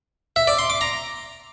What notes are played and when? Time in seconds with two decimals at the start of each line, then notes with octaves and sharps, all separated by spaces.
0.36 E5
0.47 D5
0.59 C6
0.70 D6
0.81 A#5